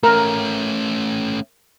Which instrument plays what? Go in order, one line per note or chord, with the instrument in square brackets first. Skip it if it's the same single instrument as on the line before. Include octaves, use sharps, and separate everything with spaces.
[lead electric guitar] A3 C#4 [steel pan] A#4